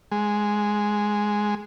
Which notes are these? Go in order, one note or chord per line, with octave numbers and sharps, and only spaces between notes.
G#3